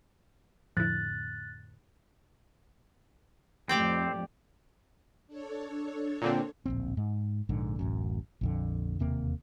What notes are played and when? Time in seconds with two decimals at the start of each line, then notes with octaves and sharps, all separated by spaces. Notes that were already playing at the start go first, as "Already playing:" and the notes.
0.77 F2 A2 D3 F3 E4 F#6 A6
3.69 F2 A2 C4 G4 D5 G5
5.27 D4 A4 C#5
6.22 A#2 D3 C4
6.66 D1 A#1 C4
6.97 G#2
7.49 A#1 G#2 D3
7.79 D1 A1 F#2
8.41 A#1 F2 D3
8.99 E1 D#2 C3 A#3